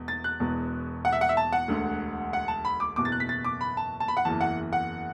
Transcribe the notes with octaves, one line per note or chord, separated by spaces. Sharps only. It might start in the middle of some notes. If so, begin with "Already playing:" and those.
Already playing: E1 E2 B2
A6
F#6
E1 E2 B2
F#5
E5
F#5
E5
A5
F#5
E1 D2 D3
F#5
A5
B5
D6
F#1 E2 B2 D6
A6
F#6
B6
A6
D6
B5
A5
A5
B5
F#5
F#1 E2 E3 A5
F#5
F#5